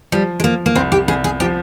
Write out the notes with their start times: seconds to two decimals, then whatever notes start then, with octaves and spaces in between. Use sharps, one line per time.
0.12 F3 G3
0.40 G#3
0.44 F3 A#3
0.66 A#3
0.75 C2 C4
0.92 G4
1.08 C2 G#4
1.24 G#4
1.40 F3 G4